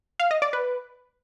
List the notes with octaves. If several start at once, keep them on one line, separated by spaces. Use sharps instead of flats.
F5
D#5
D5
B4